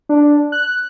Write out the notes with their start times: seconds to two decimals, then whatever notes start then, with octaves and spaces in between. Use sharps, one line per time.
0.09 D4
0.52 F#6